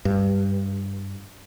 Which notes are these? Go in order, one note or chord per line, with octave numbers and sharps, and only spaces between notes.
G2